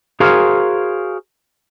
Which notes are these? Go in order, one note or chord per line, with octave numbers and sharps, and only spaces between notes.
F#4 G#4 A#4 C5 F5